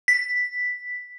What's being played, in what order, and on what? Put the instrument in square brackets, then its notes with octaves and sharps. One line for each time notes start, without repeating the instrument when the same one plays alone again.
[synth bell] B6